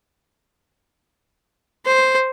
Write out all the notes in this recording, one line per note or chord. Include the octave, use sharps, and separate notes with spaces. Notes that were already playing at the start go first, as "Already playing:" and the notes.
C5